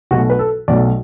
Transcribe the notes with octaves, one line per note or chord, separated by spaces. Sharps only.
B1 B2 F#3 A3 F#4
B4
A4
B1 B2 F#3 A3 D5